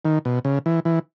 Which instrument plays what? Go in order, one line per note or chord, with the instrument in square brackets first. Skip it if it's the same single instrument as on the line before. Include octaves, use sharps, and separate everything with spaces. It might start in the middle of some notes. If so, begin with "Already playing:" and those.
[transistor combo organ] D#3
B2
C#3
E3
E3